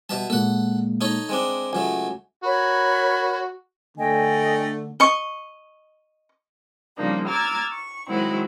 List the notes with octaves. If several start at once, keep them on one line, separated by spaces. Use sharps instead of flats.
B2 G3 E5 A5
A#2 G#3 A#3 A4 F#5
D#4 A4 C#5
G#3 C4 D4
C#2 F#3 A3 G#5
F#4 A#4 C#5 B5
D3 A3 D#5 G5 G#5
D#5 C#6
C#3 F3 G3 A#3 D4 D#4
A#5 D6 E6 F6 G#6 A6
C#6
D#3 F#3 G#3 C4 E4 F#4